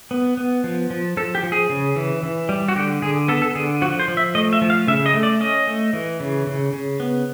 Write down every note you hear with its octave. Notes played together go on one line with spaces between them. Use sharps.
B3
B3
F3
F3
F3 A4
G4
F3
G#4
C#3
E3
E3
G3
F#4
D3 G4
D3 G#4
B3 A4
A4
D3 G#4
F3 F#4
C5
F3
E5
A3 D#5
E5
F3
F5
C#3 E5
D#5
A3
D5
C#4 D#5
A3
E3
C#3
C#3
C#3
B3